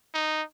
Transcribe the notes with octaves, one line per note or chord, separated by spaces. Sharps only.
D#4